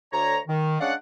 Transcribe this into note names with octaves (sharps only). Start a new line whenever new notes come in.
D2 C#5 A#5
D#3
G#3 C#4 D4 D5 F5 F#5